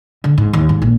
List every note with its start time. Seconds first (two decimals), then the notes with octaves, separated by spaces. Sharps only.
0.24 D3
0.38 G#2
0.53 D#2
0.69 G#2
0.82 A#1